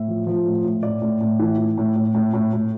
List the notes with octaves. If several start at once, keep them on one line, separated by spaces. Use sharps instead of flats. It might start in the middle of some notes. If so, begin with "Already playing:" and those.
Already playing: A2 E5
F3
F3
A2
A2
A2 D5
A2
A2
E3
E3
A2
A2
A2
A2
A2